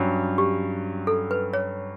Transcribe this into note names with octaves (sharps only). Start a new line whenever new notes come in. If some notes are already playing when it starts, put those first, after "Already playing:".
Already playing: G2 F#3 C#4
G4
A4
B4
C#5